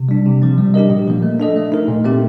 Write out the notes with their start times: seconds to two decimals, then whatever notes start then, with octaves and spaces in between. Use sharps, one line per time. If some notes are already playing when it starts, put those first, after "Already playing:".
Already playing: C3
0.09 G3 D4
0.26 C3
0.42 F3 C4
0.58 G3
0.74 D4 G4 A#4 D#5
0.90 A#2
1.07 F3 A#3
1.23 A3
1.39 D4 A4 D#5
1.56 A3
1.72 D#4 A#4
1.88 A#2
2.04 A3 C4 G4